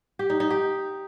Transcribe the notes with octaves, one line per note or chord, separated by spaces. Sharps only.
G4
D#4
D#4
G4